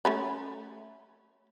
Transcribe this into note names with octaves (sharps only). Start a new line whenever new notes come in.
A3 C#4 B5